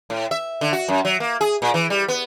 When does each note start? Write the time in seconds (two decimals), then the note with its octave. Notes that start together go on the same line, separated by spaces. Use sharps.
0.10 A2
0.31 E5
0.61 D3
0.73 F#4
0.88 F#2
1.05 F#3
1.20 A#3
1.41 G#4
1.62 A#2
1.74 E3
1.90 G3
2.08 B3